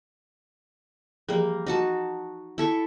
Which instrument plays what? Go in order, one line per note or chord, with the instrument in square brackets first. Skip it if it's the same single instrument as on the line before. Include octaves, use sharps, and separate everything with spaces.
[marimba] E3 F3 G#4 [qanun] G3 A#3
[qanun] D#4 F#4 A5
E4 A4 C#6